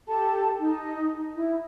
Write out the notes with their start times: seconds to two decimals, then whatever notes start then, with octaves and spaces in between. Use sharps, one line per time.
0.07 G4 A4 A5
0.59 D#4
1.36 E4